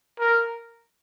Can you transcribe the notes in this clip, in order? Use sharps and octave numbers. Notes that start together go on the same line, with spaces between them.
A#4